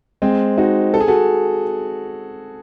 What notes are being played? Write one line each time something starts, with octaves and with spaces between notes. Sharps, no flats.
G#3 C4
D#4 F#4
A4
G#4
F#4 A4